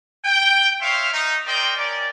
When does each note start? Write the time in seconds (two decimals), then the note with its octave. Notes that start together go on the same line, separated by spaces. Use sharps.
0.25 G5
0.81 C5 C#5 E5 F5
1.13 D#4
1.46 A#4 C5 D5 D#5 G5
1.76 C#4 A#4 D5